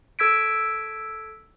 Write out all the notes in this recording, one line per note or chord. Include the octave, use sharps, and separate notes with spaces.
A4 E6 G#6 B6 D7